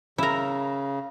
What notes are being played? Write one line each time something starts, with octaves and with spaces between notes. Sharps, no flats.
C#3 E4 A#4